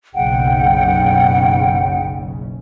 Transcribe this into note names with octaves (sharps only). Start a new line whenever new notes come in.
F#1 B1 C#3 F#5 G5